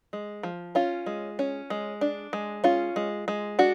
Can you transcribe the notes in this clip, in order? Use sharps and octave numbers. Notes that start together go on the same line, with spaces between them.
G#3
F3
C#4 F4
G#3
C#4
G#3
D4
G#3
C#4 F4
G#3
G#3
D4 F#4